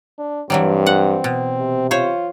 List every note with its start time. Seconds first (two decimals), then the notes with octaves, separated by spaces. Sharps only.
0.19 D4
0.50 G2 E3 F#3 G3 C4
0.86 F#5
1.24 B2
1.59 C3
1.91 F4 C5 C#5